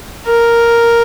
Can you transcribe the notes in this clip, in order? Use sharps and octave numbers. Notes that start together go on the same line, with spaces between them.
A#4